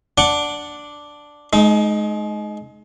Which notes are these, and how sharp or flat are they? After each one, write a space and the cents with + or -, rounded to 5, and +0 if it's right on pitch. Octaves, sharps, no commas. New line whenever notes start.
D4 +0 F#5 +0 D6 +0
G#3 +35 D#4 -5